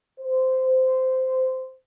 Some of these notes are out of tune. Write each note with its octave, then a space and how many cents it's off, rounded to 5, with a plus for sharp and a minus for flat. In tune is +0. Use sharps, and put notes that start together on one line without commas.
C5 -15